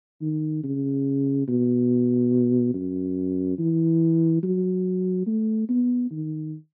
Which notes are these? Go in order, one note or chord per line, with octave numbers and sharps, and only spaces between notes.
D#3
C#3
B2
F#2
E3
F#3
A3
B3
D#3